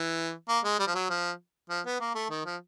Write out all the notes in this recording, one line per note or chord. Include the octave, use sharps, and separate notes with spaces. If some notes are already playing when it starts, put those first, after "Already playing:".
Already playing: E3
A#3
G#3
G3
F3
F#3
F3
F3
B3
A#3
A3
D#3
F3